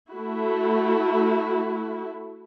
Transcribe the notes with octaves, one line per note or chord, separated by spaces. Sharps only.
A3 E4 F#4